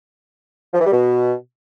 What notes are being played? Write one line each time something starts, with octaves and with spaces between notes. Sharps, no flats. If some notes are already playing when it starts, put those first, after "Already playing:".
F3
E3
G3
B2